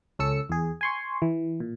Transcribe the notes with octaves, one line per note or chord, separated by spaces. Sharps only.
C#2 C#4 A4 E6 C#7
E2 G#4
G#5 C6 C#6
E3
A#2